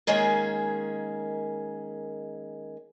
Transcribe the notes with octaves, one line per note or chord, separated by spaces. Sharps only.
D#3 G#3 A#3 C#4 G#4 C#5